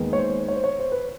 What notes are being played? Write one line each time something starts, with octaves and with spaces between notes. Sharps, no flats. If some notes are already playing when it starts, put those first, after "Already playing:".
Already playing: D#2 D#3 G#3 B3
C#5
C5
C#5
C5
C#5
C5
B4